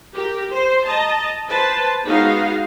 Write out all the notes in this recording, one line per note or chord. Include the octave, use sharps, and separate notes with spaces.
G4 A#4
C5
D#5 A5 A#5
B4 C5 A5 C6
G#3 B3 D#4 F#4 F5